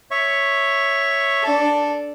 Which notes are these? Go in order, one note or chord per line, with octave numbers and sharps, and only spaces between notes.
C#5 E5 C#6
D4 A4